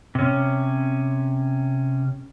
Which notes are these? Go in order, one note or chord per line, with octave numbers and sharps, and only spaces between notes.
C3 C#4